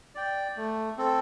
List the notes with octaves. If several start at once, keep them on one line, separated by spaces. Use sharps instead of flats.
D5 G5
A3
C4 A4